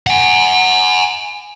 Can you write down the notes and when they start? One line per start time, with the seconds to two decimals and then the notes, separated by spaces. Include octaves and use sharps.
0.07 F#5 G#5